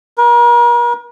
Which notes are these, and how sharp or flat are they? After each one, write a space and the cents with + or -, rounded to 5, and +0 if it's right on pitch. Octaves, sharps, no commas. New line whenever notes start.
A#4 +40